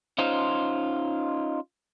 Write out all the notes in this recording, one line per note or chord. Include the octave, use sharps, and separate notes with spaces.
C#4 D#4 F4 C5